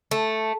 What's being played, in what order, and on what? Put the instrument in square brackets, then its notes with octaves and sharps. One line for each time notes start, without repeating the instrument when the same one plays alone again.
[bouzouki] A3